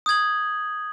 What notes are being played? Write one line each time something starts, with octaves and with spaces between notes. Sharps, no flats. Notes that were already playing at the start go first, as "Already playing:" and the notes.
D#6 G6 G#6 F#7